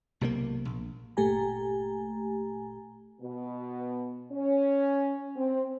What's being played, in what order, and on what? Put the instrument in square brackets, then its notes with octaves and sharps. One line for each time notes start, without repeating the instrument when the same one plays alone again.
[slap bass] B1 C3 F3 A#3
A#1
[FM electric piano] G1 A#2 A3 G4 G#5 A#5
[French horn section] B2
C#4
C4